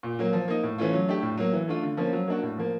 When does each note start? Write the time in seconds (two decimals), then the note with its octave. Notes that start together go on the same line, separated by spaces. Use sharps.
0.03 A#2
0.19 F#3 A#3
0.33 F3
0.48 A#3 D#4
0.63 A2
0.78 E3 A3 C#4 F4
0.93 F#3
1.08 A3 D4 G4
1.22 A2
1.37 F#3 A#3
1.53 E3
1.68 A3 D4 F4
1.83 D3
1.97 F3 A#3 C#4
2.13 F#3
2.27 A#3 D4 F#4
2.43 A2
2.58 F3 A#3